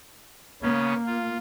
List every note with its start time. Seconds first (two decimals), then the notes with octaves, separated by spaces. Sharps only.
0.62 C#3 A#3 B3 C#4
1.07 F4